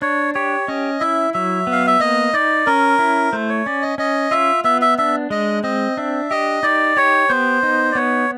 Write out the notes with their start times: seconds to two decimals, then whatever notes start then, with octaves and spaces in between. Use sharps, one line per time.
0.02 D4 C#5
0.34 G4 C#5
0.68 C#4 D#5
1.00 E4 E5
1.34 F#3 E5
1.67 B3
1.72 F5
1.87 E5
2.00 A#3 D#5
2.34 D#4 D5
2.66 C#4 A#4
2.99 E4
3.32 A3 C5
3.49 C#5
3.66 C#4 D5
3.82 D#5
3.98 C#4 D#5
4.31 F4 E5
4.64 B3 E5
4.82 E5
4.98 D4 E5
5.30 G#3 D#5
5.63 C4 D#5
5.97 D4 E5
6.31 G4 D#5
6.63 D#4 D5
6.97 G4 C#5
7.29 B3 C5
7.63 D#4
7.92 D5
7.95 B3 C#5